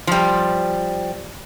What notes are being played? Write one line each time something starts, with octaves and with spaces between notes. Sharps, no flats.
F3 G3